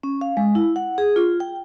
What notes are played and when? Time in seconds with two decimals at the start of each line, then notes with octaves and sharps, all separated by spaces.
0.03 C#4
0.21 F5
0.37 G#3
0.55 E4
0.76 F#5
0.98 G#4
1.16 F4
1.40 G5